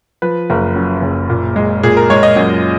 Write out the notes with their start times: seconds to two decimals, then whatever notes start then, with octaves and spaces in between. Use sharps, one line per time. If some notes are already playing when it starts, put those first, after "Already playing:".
0.22 F3 B4
0.50 F#1 A#4
0.76 F#2
1.02 F#1
1.29 A#2
1.56 G#3
1.83 A#2 G#4
1.97 A#4
2.10 G#3 C#5
2.23 D#5
2.36 F#2